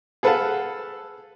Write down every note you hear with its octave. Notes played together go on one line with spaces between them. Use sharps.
G#4 A4 B4 F5 F#5 A5